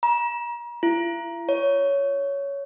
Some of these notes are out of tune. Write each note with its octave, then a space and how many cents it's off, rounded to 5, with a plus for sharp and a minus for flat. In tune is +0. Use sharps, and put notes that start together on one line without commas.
A#5 +40
E4 +45
C#5 +10